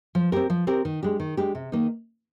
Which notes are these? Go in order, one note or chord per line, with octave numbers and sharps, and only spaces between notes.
F3
C4 G4 A#4
F3
C4 G4 A#4
D#3
G#3 D4 G4
D#3
G#3 D4 G4
C3
D#3 A#3 D#4